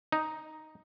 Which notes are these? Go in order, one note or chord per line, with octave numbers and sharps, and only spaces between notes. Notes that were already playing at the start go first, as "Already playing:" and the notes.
D#4